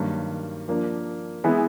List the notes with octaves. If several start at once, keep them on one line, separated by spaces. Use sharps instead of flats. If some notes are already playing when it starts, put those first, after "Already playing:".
Already playing: G2 D#3 F#3 A#3
F3 A#3 D4
E3 G#3 B3 E4